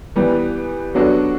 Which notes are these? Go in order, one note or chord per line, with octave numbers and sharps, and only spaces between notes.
E3 G3 B3
F#3 B3 D4 F#4 A4